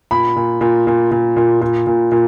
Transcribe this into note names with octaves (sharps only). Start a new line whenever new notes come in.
A#2 B5
A#2
A#2
A#2
A#2
A#2
A#2
A#2
A#2